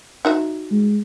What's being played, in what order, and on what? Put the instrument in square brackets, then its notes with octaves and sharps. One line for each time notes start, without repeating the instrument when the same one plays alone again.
[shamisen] D#4 F#4 E5
[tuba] G#3